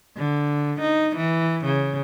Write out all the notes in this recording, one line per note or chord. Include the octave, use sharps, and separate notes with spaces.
D3
D#4
E3
C#3